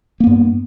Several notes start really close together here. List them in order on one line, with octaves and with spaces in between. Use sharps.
A#3 B3 G2